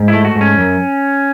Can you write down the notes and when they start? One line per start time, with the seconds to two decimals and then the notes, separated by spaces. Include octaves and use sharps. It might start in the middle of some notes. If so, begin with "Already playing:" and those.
Already playing: G#2
0.08 E4
0.13 A3
0.25 F#4
0.35 G#2
0.41 C#4
0.58 F#2